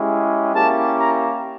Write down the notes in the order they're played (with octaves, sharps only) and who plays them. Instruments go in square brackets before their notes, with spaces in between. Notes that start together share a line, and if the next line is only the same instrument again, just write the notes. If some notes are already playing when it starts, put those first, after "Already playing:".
Already playing: [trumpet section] G#3 C#4 E4 G4
A#3 C#4 E4 G4 A5
A#5